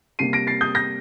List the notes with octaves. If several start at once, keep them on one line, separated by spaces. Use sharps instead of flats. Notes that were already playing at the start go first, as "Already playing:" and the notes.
C3 G3 A#3 C7 D#7
A#6 D7
A6 C7
D#6 G6
G6 A#6